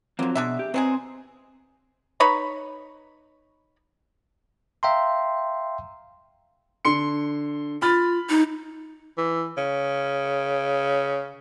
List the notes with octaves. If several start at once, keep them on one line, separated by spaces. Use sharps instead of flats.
D3 F3 F#3 A#3 C4
B2 G#3 D4 E5
G4
F#3 G#3 C4 G#4 B4 C5
D#4 B4 C#5 B5
E5 F5 G5 A#5 C6
D3 C6 C#7
F4 B5 F6 A6
D#4
E3
C#3